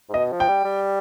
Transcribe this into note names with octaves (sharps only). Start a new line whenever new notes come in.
G#2
B2 D#5
F3
G5
G3
G3